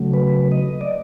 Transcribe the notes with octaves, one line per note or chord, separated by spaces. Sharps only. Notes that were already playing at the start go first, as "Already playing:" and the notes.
Already playing: C#3 F#3 A3
B4
D#5
D5